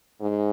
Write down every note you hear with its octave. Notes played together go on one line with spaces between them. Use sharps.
G#2